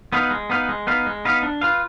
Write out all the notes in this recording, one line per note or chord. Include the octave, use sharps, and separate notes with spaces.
B3 D#4 B4 F5
G#3
B3 D#4 B4 F5
G#3
B3 D#4 B4 F5
G#3
B3 D#4 B4 F5
D4
F4 B4 F5